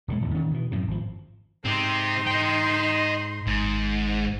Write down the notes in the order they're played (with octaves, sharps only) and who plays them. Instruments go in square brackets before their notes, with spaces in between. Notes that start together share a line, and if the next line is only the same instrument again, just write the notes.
[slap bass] E1 A2 C3 G#3
D1 E2 G2
D2 D#3 C#4
B2 E3
F#2 A2 C3
G#1 F3
[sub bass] G#2 [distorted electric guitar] C4 G4 [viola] D#4 C6
[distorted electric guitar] D#5 G5
[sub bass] G#1 [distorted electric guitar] G#2